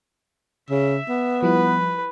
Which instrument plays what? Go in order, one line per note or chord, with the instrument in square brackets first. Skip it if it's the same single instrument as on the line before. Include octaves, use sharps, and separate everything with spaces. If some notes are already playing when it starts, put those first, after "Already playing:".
[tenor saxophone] C#3 [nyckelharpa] E5
[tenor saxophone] B3
[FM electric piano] F3 G3 E4 [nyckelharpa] B4